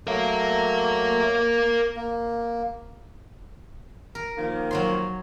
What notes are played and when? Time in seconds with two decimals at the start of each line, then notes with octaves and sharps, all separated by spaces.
0.07 F#3 A3 A#4 F5
1.97 A#3
4.15 A#4
4.37 D#3 F3 A#3
4.71 F#3 C#5 C6